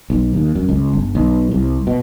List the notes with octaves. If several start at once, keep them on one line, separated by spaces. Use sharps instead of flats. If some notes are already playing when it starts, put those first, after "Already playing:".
B1
D#2
F#2
C#2
G1
B1
C2
B2